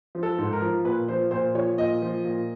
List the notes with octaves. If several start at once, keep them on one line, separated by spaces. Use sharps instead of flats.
F3
A4
G#2
A#4
F3
A#2 B4
F3 C5
A#2 C5
F3 C#5
A#2 D#5
F3
A#2